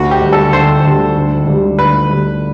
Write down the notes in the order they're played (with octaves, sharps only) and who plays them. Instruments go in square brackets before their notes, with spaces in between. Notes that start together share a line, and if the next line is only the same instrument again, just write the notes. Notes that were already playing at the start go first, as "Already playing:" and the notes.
Already playing: [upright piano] D2 [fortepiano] F#4
[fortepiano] G4
[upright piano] D3 G3
[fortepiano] A4
[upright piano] D2 [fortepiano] C5
[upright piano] D3 G3
D2
D3 G3
[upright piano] D2 [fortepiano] B4
[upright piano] D3 G3